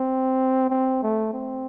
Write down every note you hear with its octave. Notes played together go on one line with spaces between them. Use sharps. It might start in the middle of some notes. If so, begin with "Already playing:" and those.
Already playing: C4
C4
A3
C4